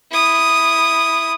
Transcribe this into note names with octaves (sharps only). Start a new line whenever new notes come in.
E4 D#6